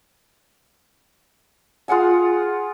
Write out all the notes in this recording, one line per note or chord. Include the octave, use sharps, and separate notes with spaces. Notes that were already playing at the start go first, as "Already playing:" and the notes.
F4 G#4 F#5 G#5